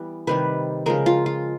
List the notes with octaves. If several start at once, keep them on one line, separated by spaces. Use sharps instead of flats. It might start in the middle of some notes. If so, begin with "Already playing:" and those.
Already playing: E3 G3 B3
C3 D#3 G3 B4
C#3 F3 G#3 A#4
F4
F4